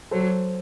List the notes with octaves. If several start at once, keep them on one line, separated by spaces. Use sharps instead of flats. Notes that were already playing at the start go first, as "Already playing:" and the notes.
F#3 A4 C5